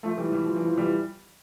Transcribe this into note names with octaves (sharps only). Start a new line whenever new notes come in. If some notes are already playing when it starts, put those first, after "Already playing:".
F3 A3
E3 G3
E3 G3
F3
E3
F3
E3 G3